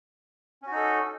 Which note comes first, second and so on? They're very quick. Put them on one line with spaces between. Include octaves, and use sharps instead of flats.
C#4 F#4 D#4 A4